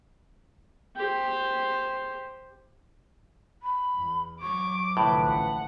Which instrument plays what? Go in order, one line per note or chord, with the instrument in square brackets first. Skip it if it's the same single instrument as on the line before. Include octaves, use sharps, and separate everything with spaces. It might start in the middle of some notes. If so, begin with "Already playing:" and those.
[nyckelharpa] G4 C5
[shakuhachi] B5
[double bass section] E2
[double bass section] F#3 [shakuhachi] C#6 [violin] D6
[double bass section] C2 D3 F3 [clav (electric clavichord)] A2 [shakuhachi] B4
[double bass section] A1 [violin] F#5